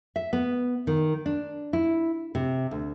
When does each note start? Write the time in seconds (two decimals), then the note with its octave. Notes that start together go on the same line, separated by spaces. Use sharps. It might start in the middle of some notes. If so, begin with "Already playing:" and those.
0.16 E5
0.33 B3
0.87 D#3
1.26 D4
1.73 E4
2.35 C3
2.71 D2